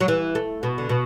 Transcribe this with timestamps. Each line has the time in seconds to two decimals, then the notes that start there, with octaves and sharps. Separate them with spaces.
0.01 F#3
0.08 E3
0.35 A3
0.63 B2
0.78 D3
0.89 B2